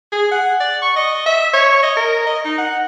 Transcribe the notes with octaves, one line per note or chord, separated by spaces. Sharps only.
G#4
F#5
D5
C#6
D#5
E5
C#5
D#5
A#4
D#5
D#4
F#5